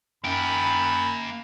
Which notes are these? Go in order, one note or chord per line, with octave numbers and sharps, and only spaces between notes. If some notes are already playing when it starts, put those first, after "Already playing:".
F#2 A#3 G5 B5